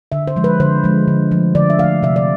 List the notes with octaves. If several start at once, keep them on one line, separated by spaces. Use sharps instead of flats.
D3 E5
C5
F3 G#3
B4
D3 C5
F3 G#3
D3
F3 A3
D3 D5
E5
F3 A3 F5
C3 E5
D5